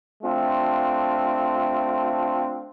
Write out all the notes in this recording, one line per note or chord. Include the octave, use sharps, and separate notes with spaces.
A3 C4 D4 F4